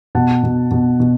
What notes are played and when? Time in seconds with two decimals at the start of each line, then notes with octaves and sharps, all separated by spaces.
0.15 B2 F#5 A5
0.43 B2
0.71 B2
1.00 B2